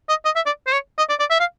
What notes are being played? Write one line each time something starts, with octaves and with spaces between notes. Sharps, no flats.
D#5
D#5
E5
D5
C5
C#5
D#5
D5
D5
E5
F5